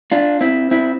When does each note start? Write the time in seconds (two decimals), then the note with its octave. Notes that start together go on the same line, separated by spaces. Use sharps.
0.12 D4 F4
0.41 C4 E4
0.71 C4 E4